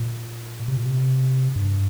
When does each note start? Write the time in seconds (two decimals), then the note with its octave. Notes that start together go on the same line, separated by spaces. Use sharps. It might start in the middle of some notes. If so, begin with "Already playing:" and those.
Already playing: A#2
0.68 C3
0.77 A#2
0.86 C3
1.56 G2